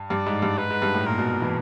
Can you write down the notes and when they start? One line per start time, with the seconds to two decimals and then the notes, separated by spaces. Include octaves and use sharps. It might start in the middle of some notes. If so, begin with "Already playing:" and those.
Already playing: G2
0.10 G2 D5
0.26 G#2
0.42 G2
0.58 G#2 B4
0.70 G#2
0.82 G2
0.94 A2
1.06 A#2 A#4
1.18 B2
1.42 E3